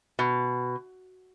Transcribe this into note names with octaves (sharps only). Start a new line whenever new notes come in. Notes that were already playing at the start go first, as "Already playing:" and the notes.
B2